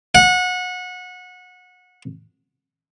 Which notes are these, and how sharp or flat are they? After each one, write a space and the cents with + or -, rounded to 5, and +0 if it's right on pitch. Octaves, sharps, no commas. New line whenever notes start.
F#5 -25